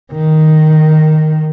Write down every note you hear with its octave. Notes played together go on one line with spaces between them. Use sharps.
D#3